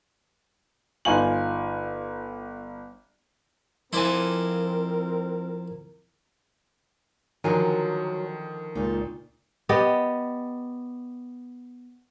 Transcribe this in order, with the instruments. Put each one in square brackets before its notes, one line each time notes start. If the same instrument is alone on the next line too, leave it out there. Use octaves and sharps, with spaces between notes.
[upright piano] G1 D#4 F4 G#5 C#6 F#7
[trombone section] F2 C4 A#4 [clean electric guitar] F3 G#5 [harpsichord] E4 C5 D5
[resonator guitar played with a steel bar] D3 A#4 G#5 [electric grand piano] D#3 D4 [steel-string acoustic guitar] F3 [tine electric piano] F#3
[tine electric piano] C#2 A#2 [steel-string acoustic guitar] D#4 A4
[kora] B3 G4 D5 D#5